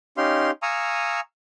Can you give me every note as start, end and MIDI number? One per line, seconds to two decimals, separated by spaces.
0.17 0.51 61
0.17 0.51 63
0.17 0.51 67
0.17 0.51 77
0.17 0.51 84
0.62 1.20 77
0.62 1.20 80
0.62 1.20 82
0.62 1.20 85
0.62 1.20 87
0.62 1.20 88